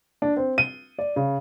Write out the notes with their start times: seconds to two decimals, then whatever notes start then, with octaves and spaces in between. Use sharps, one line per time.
0.22 D4
0.37 C4
0.58 D#7
0.99 D5
1.16 C#3